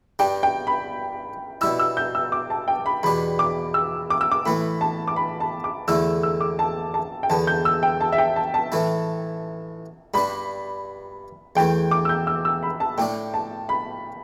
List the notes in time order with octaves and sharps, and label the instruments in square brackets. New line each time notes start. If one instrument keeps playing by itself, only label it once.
[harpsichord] G2 G3 D4 [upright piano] G5
[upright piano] G5
B5
[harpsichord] B2 G3 E4 [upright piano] E6
[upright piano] E6
G6
E6
D6
A5
G5
B5
[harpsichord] E2 B2 G3 D4 [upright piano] B5
[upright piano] D6
E6
D6
E6
D6
[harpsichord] A2 E3 A3 [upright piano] B5
[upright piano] A5
D6
B5
A5
D6
[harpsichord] E2 D3 A3 E4 [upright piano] E6
[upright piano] E6
D6
A5
A5
G5
[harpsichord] E2 D3 B3 [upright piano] A5
[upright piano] G6
E6
G5
A5
E5
G5
A5
A5
[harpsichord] A2 E3 A3 E4
[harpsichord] G2 G3 D4 [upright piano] B5
[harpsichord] E2 E3 A3 [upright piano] G5
[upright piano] D6
E6
G6
E6
E6
B5
A5
[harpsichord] A2 A3 D4 [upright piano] G5
[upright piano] A5
B5